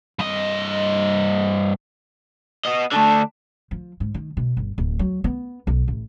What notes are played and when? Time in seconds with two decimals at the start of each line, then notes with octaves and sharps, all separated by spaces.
0.19 G2 D#5
2.65 B3 D#5
2.92 D3 A3 D4 A5
3.71 F3
4.00 G#2
4.14 D#3
4.37 B2
4.57 G1
4.78 D1
4.99 F#3
5.24 B3
5.67 B1
5.88 A1